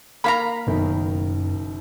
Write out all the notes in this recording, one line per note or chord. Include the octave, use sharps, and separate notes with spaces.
A#3 A#4 F5 A#5 B5
F#1 F#2 B2 D#3